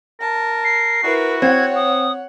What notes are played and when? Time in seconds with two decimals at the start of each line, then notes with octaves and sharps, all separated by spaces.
0.21 A#4 A5
0.64 C7
1.03 E4 F#4 A#4 B4
1.42 C4 C#5 F#5 G#6
1.76 D#6